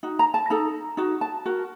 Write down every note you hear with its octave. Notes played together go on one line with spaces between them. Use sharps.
D#4 F#4
A#5
A5
D#4 A4 A#5
D#4 F#4
A5
F#4 A#4